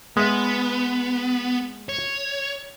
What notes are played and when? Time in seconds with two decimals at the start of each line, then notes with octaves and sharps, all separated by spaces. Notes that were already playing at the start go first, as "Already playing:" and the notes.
0.17 G#3 B3 E5
1.89 C#5